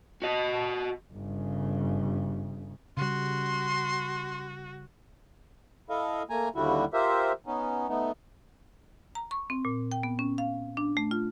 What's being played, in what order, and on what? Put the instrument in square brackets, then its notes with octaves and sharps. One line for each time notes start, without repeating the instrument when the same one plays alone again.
[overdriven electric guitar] F#4 D#5
[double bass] G1 C#3
[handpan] C#3 G3 [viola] F#4 [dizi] C6
[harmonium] E4 A4 D#5 F5
A3 A#3 G#5 A#5
D#2 D3 G3 E4 F#4
F4 G4 A#4 C5 E5
B3 C#4 D#4
A3 B3 D#4
[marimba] A#5
C#6
C4
A#2
G5
B3
C#4
F5
D4
A3
F4